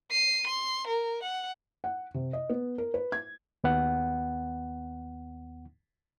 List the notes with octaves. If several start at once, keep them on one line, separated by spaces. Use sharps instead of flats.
C7 D#7
C6
A#4
F#5
F#5
C3
D#5
B3
A#4
B4
G#6
D#2 B3 F#5